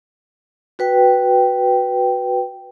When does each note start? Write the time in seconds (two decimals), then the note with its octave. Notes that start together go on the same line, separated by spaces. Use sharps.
0.79 F#4 B4 G5